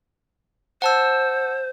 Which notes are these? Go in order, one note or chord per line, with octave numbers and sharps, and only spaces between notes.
C5 F#5 A5 E6